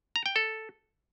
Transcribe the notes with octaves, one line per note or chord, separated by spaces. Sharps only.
A#5
G5
A4